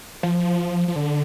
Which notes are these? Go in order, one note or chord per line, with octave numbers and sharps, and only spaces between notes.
F3
F3
D3